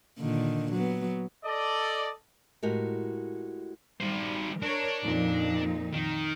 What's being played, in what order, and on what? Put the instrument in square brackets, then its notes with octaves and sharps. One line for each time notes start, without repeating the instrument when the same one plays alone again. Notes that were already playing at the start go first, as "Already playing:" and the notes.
[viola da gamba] A#2 D3 D#3
F#3 B3
[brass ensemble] A4 D5 D#5
[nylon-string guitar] A2 G#3 F#4 G4 A#4
[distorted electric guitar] D#3 C5 [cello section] G3
[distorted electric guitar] D4 [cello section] A#4 C#5
[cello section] F2 A#2 D#4
[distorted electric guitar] D#3